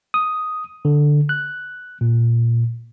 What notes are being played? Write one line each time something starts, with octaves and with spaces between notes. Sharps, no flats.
D#6
D3
F#6
A#2